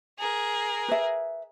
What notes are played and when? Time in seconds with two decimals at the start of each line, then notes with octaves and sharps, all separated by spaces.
0.19 G#4 A#4
0.89 B4 E5